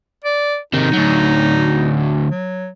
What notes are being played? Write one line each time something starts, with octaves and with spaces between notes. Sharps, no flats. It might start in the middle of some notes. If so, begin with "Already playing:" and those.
D5
C3 D#3 D#4
D2 F#3
F#3